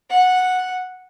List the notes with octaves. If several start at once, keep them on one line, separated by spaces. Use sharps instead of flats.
F#5